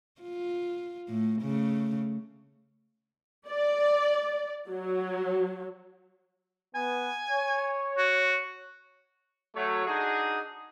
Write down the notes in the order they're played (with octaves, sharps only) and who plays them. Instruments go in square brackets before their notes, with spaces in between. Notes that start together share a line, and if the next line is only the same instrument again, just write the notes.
[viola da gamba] F4
A2 A3
C#3 A3
[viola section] D5
F#3
[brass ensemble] B3 [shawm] G#5
[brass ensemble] C#5
[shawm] F#4
[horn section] F#3 A3 C#5
D4 D#4 F#4 G#4